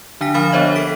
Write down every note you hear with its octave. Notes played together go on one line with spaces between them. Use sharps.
D3 D4 G#5 B6
F3 A#4 F5 B5 F6 A6
B3 D4 C5 C#5 D#5 E5
A4 B6 D7